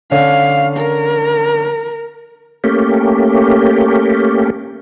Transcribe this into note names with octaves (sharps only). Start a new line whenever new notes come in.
D3 C#4 D4 F5
A#4
A3 A#3 C#4 G4